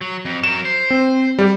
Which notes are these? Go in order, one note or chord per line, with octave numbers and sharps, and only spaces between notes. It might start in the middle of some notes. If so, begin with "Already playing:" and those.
F#3
F2
F#3 A#4 E7
C5
C4
G3 G4